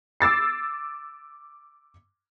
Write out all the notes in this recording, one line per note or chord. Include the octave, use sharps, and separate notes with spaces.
D6 E6 A6 C7